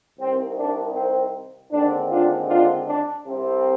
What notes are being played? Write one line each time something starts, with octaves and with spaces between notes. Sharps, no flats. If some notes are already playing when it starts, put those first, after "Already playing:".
C2 C3 D#3 C4
D4
C4
D#2 D3 G#3 C4 D4
D4 F4
D4 F4
D4
C2 C3 G3 C4